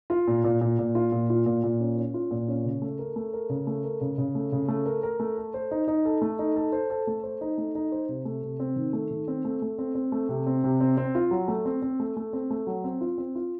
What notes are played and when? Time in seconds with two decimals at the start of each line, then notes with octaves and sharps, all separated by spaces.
0.10 F4
0.28 A#2
0.44 A#2
0.61 A#2
0.79 A#2
0.95 F4
1.12 A#2
1.30 F4
1.46 A#2
1.64 A#2
1.80 C#4
1.97 C#4
2.14 F4
2.31 A#2
2.48 C#4
2.65 C#3
2.82 A3
2.99 A#4
3.16 A3
3.33 A#4
3.49 C#3
3.67 A3
3.84 A#4
4.01 C#3
4.18 C#3
4.35 A3
4.52 C#3
4.68 A3
4.86 A#4
5.03 A#4
5.20 A3
5.37 A4
5.54 C5
5.71 D#4
5.88 D#4
6.05 A4
6.22 A3
6.39 D#4
6.56 A4
6.72 C5
6.90 A4
7.07 A3
7.23 C5
7.41 D#4
7.58 A3
7.75 D#4
7.92 C5
8.09 C3
8.25 A3
8.43 C3
8.60 C4
8.76 D#3
8.93 A3
9.11 D#3
9.28 C4
9.45 A3
9.62 A3
9.78 C4
9.95 C4
10.12 A3
10.29 C3
10.47 C4
10.64 C3
10.81 C4
10.97 C4
11.15 F4
11.31 F#3
11.48 A3
11.65 C4
11.82 C4
12.00 A3
12.17 A3
12.33 C4
12.50 A3
12.67 F#3
12.84 C4
13.01 F4
13.18 C4
13.35 F4